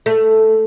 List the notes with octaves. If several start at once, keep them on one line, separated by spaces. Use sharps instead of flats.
A3